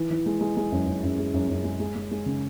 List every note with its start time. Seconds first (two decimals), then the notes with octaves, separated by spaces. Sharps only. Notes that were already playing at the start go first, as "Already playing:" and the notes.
Already playing: E3
0.11 E3
0.26 G#3
0.41 G#3
0.57 G#3
0.72 F#2
0.87 F#2
1.03 F#2
1.19 G#3
1.34 F#2
1.49 F#2
1.64 G#3
1.80 G#3
1.95 G#3
2.11 G#3
2.26 C#3